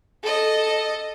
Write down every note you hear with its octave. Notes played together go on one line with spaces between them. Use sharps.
A4 D#5